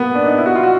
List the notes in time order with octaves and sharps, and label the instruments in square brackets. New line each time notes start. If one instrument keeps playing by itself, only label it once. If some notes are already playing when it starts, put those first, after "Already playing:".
Already playing: [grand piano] A#3 B3
D4
D#4
E4
F#4
F4
F#4